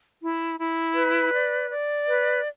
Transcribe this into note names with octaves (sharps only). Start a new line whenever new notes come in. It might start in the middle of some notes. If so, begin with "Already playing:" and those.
E4
E4
B4
D5
D5
B4